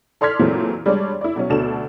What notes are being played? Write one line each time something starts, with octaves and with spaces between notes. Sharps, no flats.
A4 D5 C6 F6 G#6 B6
A#2 E3 F#3 G#3 A3 C4
G3 G#3 D4 C#5 D5
E4 D5
B2 F#3 C#4
D2 B2 D4 A4 E7